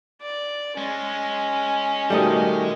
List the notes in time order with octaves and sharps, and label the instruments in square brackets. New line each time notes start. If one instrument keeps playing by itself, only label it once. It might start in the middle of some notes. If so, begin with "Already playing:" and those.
[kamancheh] D5
[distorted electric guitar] G#3 [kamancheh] C#4
[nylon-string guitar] B2 D#3 A3 [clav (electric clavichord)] G3 D#5